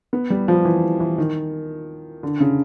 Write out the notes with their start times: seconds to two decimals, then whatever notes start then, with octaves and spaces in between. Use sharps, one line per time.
0.13 B3
0.30 G3
0.48 F3
0.65 E3
1.00 E3
1.18 D#3
2.23 D3
2.40 C#3